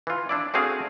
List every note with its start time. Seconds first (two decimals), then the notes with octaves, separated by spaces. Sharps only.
0.07 E3 F4
0.29 D4 E4 D5
0.54 A3 C4 D4 F#4 G#4 F5